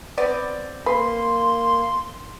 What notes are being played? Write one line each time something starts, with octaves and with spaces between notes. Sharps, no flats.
B3 C4 D5
A#3 B4 C6